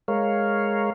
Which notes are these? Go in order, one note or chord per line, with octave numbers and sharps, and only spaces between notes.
G#3 A#4 C#5 F5